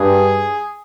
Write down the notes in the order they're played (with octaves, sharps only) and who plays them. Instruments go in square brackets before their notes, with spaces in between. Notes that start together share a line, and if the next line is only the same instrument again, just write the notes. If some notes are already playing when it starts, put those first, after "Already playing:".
Already playing: [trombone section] G2 [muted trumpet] G#4